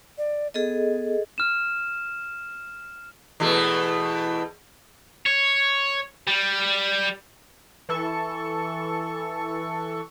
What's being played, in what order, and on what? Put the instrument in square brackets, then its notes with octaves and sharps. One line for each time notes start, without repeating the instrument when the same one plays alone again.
[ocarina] D5
[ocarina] B3 [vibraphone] G#4 A4 D#5
[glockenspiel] F6 E7
[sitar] E2 B2 A3
[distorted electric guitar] C#5
G3
[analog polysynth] E3 A4 C#6